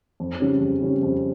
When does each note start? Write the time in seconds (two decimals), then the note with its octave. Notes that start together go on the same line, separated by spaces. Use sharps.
0.20 F2
0.40 C#3 G3 C#4
0.61 F2
0.82 C#3 G3 C#4
1.03 F2